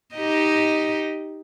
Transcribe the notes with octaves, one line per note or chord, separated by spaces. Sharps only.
D#4 G4 D#5